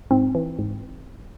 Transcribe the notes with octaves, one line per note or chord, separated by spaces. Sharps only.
G#2 C4
E3
G#2